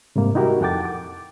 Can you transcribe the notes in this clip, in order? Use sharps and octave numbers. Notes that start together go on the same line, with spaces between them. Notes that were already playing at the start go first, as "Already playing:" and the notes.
G#2 C3 G3 A#3
D#4 E4 F#4 G4 A#4
F2 A4 F#5 G5 D6 A6
D6